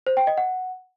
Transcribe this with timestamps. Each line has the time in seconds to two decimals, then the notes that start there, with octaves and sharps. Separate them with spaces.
0.07 C5
0.17 G5
0.27 D#5
0.37 F#5